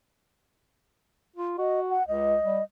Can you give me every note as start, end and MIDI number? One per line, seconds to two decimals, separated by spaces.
1.36 1.58 65
1.58 1.97 66
1.58 1.81 75
1.90 2.06 78
2.08 2.35 37
2.08 2.63 75
2.45 2.60 55